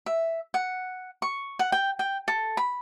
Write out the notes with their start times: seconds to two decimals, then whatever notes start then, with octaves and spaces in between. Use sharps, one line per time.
0.06 E5
0.54 F#5
1.22 C#6
1.59 F#5
1.72 G5
1.99 G5
2.28 A4
2.57 B5